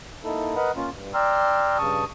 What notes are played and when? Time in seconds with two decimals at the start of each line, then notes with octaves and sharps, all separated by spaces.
0.24 A#3 D#4 E4 A4
0.56 A#4 B4 D#5 F#5 B5
0.76 A#3 C#4 F4
0.92 G2
1.14 D5 G5 A#5 C6 E6 F6
1.78 G2 C#3 A5 C#6 D#6